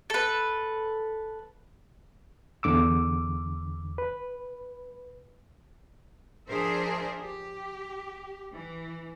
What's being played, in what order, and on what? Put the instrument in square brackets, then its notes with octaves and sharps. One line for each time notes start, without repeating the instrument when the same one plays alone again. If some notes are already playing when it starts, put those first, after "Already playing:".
[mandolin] A4 B4
[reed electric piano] E2 D3 D6 E6
B4
[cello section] F3 D4 G#4 A#4 C5 E5
G4
E3